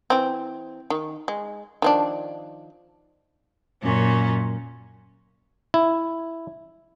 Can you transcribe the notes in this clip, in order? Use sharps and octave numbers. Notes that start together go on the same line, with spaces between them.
E3 C4
D#3
G#3
D#3 F3 D4
F#2 A#2 C#4
E4